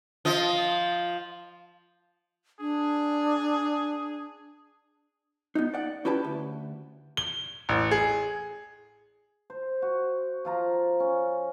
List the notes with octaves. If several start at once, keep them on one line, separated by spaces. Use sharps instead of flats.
F3 D#5
D4 G#4
B3 D#4
D5 F#5
C#4 E4 G4 B4 A5
D2
G7
A1
G#4
C5
F#4
F3 F4 A#5
C#4